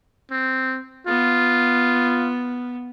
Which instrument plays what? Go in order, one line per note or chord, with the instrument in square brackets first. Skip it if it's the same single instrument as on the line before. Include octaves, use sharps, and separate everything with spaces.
[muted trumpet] C4
[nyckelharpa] B3 [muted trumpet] F4